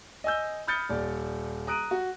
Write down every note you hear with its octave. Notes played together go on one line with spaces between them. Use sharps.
D#5 G#5 E6 G6
B5 D#6 F6 G6 A6 C#7
D#1 D5
A#5 D#6 F#6 D7 D#7
F#4